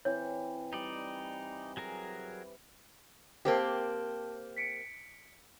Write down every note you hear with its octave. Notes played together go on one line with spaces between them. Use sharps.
E3 C4 C#5
G3 D#4 D5
F#3 G#4 A#4
A#3 C4 G4 A#4 C5 A5
B6 C#7 D7